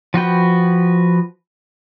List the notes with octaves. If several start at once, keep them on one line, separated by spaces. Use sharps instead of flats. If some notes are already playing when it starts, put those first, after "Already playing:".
F3 F#4 B4 G5